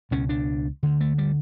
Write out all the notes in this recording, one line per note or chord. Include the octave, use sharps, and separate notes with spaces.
C#2 B2 C#4
D4
D2 D3
A3
G3